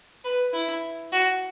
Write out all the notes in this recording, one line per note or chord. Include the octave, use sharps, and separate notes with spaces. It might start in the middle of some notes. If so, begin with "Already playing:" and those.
B4
E4
F#4